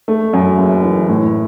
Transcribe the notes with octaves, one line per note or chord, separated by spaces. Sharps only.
A3
F#2
F#1
E3
A2